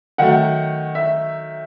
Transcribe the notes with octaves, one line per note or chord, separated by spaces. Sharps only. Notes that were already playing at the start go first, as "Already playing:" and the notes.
D#3 F#3 A3 F#5
E5